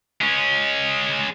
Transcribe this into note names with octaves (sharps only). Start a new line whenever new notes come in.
G#3 C#4